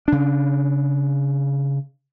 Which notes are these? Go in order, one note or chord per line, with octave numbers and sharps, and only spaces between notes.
C#3 D4